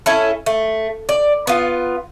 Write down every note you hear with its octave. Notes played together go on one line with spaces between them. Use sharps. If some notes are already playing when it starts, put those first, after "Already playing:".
C#4 E4 A4
A3
D5
B3 F4